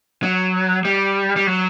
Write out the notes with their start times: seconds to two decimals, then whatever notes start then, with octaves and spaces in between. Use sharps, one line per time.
0.23 F#3
0.85 G3
1.36 G3
1.47 F#3